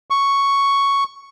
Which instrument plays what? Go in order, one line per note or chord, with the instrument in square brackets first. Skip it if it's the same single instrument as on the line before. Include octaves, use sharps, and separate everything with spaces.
[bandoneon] C#6